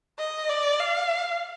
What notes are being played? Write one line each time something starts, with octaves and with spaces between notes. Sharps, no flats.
D#5
D5
F5